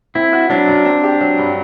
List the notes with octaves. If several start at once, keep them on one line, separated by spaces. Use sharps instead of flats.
C4 E4
F#4
F#3 D4
F#2
C4
G4
F#3
G2